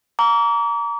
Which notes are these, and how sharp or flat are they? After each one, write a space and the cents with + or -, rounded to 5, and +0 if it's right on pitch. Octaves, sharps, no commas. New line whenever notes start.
A#5 +0 D6 -40